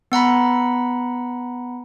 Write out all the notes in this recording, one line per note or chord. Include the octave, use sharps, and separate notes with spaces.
B3 F#5 A#5 B5